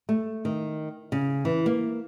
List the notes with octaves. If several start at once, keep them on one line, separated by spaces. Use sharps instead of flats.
A3
D#3
C#3
E3
A#3